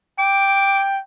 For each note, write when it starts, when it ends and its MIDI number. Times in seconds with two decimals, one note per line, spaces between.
0.19 0.98 79
0.19 0.82 86